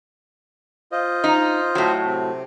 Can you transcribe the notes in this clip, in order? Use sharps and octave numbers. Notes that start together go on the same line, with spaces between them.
F4 C5 D#5
D#4
A2 F#3
C3 C4